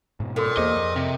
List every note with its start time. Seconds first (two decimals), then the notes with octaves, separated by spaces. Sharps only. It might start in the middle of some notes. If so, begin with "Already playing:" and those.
0.20 G#2 B2
0.36 A#2 F#4 A4 A#4
0.57 E2 A#3 G#4 C5 D#5
0.76 F2
0.96 C3